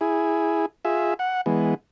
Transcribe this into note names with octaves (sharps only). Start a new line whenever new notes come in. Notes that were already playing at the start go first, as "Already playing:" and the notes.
E4 G#4
F4 G#4 E5
F#5
E3 G#3 B3